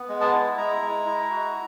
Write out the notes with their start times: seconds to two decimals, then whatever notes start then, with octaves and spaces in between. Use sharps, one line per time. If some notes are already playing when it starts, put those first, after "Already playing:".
Already playing: B3
0.08 G#3
0.21 A5
0.33 E4
0.57 G#3 A#5
0.81 G#3
1.06 E4
1.30 F#4